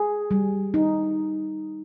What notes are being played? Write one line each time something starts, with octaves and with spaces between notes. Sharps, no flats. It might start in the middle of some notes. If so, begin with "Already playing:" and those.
Already playing: G#4
G3
D#4